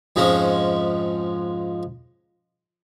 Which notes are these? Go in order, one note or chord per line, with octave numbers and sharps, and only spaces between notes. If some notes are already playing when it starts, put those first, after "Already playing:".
F2 G#2 F3 G#3 C#4